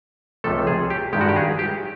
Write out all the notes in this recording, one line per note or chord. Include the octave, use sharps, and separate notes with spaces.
C#2 C3 F3 A3 A4
G#4
G4
G2 D#3 G#3 G4
F#4
G4
G#4
G4